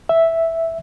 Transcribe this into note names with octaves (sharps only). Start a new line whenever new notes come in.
E5